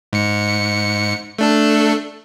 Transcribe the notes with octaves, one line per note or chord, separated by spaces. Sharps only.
G#2 C#7
A3 D4 A4